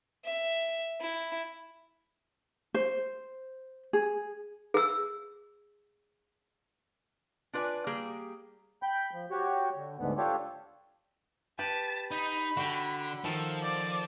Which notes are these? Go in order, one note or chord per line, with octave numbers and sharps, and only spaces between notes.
E5
E4
C5
G#4
G#4 E6
D4 F4 B4 D5 G#5
G3 A#3 G#4
G5 B5 G6
F3
F#4 G4 C#5
D3
D2 G#2 D3 B3
D4 F4 G4 A4 C#5
G4 B4 A5
D#4 D#5 B5
D3 F#4 G5
D#3 F3 A4
D5